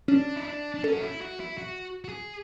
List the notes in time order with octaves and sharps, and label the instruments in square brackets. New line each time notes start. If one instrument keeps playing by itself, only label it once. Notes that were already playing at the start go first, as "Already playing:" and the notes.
[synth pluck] C#4 [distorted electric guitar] D4
[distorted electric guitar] E4
D4
D4
[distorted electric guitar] C#4 [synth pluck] A4
[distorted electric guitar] F#4
E4
F#4
E4
F#4
F#4
G#4